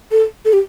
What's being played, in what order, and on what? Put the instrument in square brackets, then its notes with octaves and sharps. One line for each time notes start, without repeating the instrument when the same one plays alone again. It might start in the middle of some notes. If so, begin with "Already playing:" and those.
[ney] A4
A4
G4